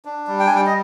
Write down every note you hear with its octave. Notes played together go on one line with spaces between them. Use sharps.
D4
G3
G5
G#5
G3
G5
D#5